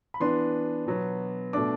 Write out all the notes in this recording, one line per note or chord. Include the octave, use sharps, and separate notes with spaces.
B5
E3 B3 D4 C6
B2 F#3 B3
B2 A3 D4 D6